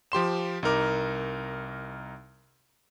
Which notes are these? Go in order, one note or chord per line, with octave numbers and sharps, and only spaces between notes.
F3 G4 C6 E7
C2 D#4 A#4 D6